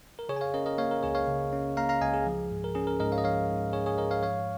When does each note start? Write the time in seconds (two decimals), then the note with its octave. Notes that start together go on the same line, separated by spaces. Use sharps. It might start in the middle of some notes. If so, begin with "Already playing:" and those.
0.19 A#4
0.29 C#3 G#4 C#5
0.36 G#5
0.41 C#5 F5
0.54 C#4 A#4 D#5
0.66 A#4 D#5
0.78 A#3 C#5 F5
0.91 A#4
1.03 C#2 G#4 C#5
1.15 C#5 F5
1.28 C#3
1.53 C#4
1.77 A#3 F5 A#5
1.89 F5 A#5
2.01 C#2 D#5 G#5
2.14 G#4
2.26 F3
2.51 G#2
2.64 A#4
2.75 C#4 G#4
2.87 A#4
3.00 G#2 A#4 D#5
3.12 C#5 F5
3.18 D#5
3.24 F3 C#5 F5
3.49 G#2
3.73 C#4 G#4 C#5
3.86 G#4 C#5
3.98 G#2 A#4 D#5
4.11 C#5 F5
4.23 F3 C#5 F5